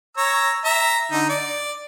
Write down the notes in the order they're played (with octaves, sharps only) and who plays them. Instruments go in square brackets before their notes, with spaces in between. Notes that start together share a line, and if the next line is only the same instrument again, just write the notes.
[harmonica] C#5 A#5 E6
E5 A#5
D3 D#4
D5